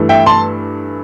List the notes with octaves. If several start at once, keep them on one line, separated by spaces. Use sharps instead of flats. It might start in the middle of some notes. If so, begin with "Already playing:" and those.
Already playing: G2 E3 A3
E5 G5
A5 C6